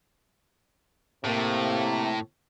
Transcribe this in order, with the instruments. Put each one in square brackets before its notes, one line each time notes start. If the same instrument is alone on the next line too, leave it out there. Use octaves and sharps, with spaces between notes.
[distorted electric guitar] A2 [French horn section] C3 A#3